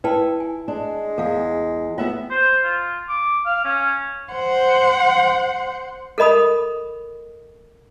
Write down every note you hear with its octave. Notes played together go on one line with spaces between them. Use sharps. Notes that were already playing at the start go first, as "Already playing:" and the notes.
E4 B4 G5 A5
G#5
G#3 D4
E2 A4 F5
B3 F4 E5 F#5
C5
F4
D6
F5
C#4
C5 F#5
A4 A#4 D#5 B5 D#6